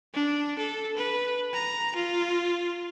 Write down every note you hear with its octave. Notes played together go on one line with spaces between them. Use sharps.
D4
A4
B4
A#5
F4